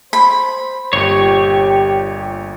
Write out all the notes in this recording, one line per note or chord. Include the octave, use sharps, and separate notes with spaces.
C5 B5
G1 A#2 G4 C#5